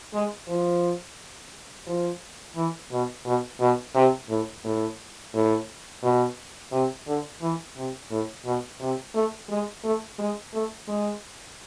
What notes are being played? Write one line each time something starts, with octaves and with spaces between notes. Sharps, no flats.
G#3
F3
F3
E3
B2
B2
B2
C3
A2
A2
A2
B2
C3
D3
E3
C3
A2
B2
C3
A3
G#3
A3
G#3
A3
G#3